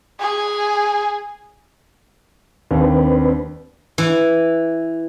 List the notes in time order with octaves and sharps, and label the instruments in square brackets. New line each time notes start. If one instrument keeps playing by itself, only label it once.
[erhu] G#4
[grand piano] D#2 [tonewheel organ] C4 D4 B4
[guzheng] E3